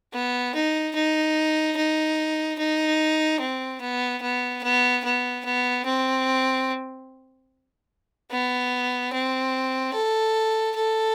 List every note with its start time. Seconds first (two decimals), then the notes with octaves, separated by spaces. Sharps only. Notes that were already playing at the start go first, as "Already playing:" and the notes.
0.14 B3
0.55 D#4
0.95 D#4
1.77 D#4
2.59 D#4
3.40 C4
3.81 B3
4.22 B3
4.63 B3
5.04 B3
5.45 B3
5.85 C4
8.31 B3
9.13 C4
9.94 A4
10.75 A4